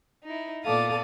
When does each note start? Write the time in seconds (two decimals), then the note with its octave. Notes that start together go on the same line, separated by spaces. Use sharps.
0.24 D#4 E4
0.64 A#2 B3 A4 D5 F5 D#6